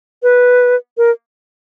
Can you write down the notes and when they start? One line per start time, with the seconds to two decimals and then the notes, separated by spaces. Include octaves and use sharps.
0.23 B4
0.97 A#4